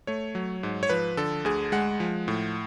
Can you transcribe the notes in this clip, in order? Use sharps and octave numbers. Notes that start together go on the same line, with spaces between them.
A3 C#5
F#3
G#2
C#5
F3 B4
D3 A4
D2 G#4
G#3 F#5
F3
A2